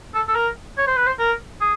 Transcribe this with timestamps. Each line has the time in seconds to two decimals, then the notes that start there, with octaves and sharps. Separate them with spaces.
0.15 A4
0.28 A4
0.35 A#4
0.78 C#5
0.87 C5
0.97 B4
1.07 C5
1.19 A#4
1.61 G#4